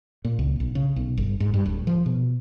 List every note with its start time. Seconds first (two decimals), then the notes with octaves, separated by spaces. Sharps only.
0.25 A#2
0.39 C#2
0.60 B1
0.75 C#3
0.96 B1
1.18 G1
1.40 G#2
1.54 G2
1.66 D1
1.87 F3
2.06 B2